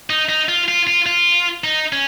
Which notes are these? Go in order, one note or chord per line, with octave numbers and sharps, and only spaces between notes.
D#4
D#4
F4
F4
F4
F4
D#4
C#4